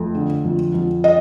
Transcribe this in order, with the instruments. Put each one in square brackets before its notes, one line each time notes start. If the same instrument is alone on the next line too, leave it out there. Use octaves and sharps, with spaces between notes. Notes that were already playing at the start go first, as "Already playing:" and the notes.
Already playing: [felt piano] F2 A3
D3
F2
F2
D#5